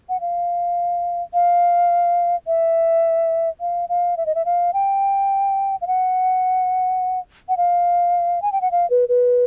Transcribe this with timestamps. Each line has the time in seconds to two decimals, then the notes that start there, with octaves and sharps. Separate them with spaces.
0.09 F#5
0.21 F5
1.34 F5
2.47 E5
3.61 F5
3.89 F5
4.17 E5
4.26 D#5
4.35 E5
4.46 F5
4.74 G5
5.82 F5
5.87 F#5
7.49 F#5
7.57 F5
8.42 G#5
8.52 G5
8.61 F#5
8.71 F5
8.90 B4
9.09 B4